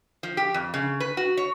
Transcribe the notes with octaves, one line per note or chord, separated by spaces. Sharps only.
F3
G4
F2
C#3
B4
F#4
C#5